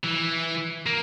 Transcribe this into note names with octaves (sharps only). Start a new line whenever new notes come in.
E3
A#3